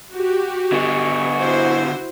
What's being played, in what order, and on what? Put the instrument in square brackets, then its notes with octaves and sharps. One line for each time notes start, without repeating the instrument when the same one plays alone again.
[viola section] F#4 G4
[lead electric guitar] D3 B3 [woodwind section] D#5 G#5 C#6
[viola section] E4 F#4 C5